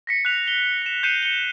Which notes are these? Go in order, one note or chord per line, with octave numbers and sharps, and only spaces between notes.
A#6 B6 C#7
F#6 B6 F7
G7
C#7 E7
G6 C7 C#7 D#7 E7
C#7 G7